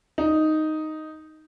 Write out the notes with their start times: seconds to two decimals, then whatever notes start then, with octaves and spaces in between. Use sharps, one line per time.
0.18 D#4